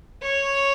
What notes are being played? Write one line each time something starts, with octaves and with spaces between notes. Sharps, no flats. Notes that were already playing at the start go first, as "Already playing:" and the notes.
C#5